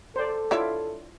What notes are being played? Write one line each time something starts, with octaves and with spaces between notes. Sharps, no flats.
A4 C5 D5
D3 E4 F4 C#5 E5 D6